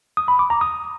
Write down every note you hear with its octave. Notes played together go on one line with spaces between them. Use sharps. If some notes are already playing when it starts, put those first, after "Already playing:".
D#6
B5
D6
A#5
D#6